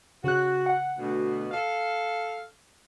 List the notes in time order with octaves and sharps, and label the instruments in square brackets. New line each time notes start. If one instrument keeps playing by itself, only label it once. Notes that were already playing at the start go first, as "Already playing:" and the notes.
[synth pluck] C#3 F#6 [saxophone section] F#4
[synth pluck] F#5
[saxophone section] D2 B2
A4 F5